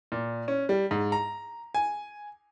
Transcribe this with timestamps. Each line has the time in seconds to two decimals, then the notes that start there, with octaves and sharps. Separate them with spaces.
0.12 A#2
0.48 C#4
0.69 G3
0.91 G#2
1.12 A#5
1.75 G#5